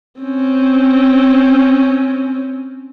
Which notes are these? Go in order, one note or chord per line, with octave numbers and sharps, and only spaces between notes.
C4 C#4